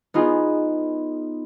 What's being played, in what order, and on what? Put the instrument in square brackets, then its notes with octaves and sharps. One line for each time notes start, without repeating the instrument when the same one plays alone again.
[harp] B3 D#4 F4 G#4